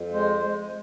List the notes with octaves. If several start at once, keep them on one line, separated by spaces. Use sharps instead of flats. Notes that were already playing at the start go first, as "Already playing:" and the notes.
Already playing: F2
G#3 C5
G#3